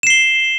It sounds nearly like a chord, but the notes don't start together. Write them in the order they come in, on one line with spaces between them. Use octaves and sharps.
E7 C7 G7